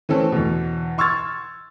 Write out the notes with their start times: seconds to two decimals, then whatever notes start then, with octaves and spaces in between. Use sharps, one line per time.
0.09 E3 A3 C4 C#4 A4
0.32 E2 B2
0.98 C6 C#6 E6 F6 G#6 A6